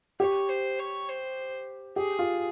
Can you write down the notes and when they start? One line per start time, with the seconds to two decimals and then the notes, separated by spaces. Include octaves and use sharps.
0.20 G4 C#5
0.48 C5
0.79 C#5
1.08 C5
1.96 G4 G#4
2.19 F4